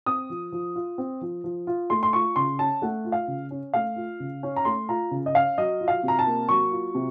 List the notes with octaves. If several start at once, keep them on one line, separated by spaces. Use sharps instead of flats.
C4 D#6
F3
F3
F4
C4
F3
F3
F4
A3 C6
C6
F4 C#6
C#3 C6
C#4 A5
A3 F#5
F4
F5
C#3
C#4
A3 F5
F4
C#3
C#4
A#5
A3 C6
F4 A#5
C#3
D#5
C#4 F5
F#3 D#5
F4
F5
C3 A#5
A5
A#3
F#3 C#6
F4
C3